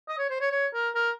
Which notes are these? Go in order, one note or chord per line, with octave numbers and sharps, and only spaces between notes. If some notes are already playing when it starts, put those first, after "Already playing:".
D#5
C#5
C5
C#5
C#5
A#4
A#4